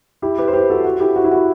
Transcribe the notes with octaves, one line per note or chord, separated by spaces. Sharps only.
E4 G4
G4 B4
C5
G4 B4
F#4 A4
F#4
E4 G4
F#4
E4
F#4